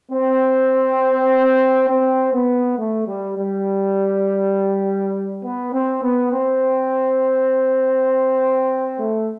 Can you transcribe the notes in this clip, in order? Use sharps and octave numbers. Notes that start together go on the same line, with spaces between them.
C4
C4
B3
A3
G3
G3
B3
C4
B3
C4
A3